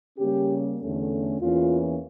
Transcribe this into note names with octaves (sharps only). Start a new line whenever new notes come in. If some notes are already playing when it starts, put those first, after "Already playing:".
C#3 G3 A#3 C#4 G4
E2 D3 A3 C#4
E2 E3 A#3 C#4 F4